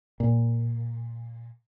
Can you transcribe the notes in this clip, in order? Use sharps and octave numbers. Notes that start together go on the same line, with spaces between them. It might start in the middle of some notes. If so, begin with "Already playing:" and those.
A#2